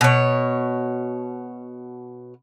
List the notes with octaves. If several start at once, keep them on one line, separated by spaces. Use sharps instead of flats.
B2 C#5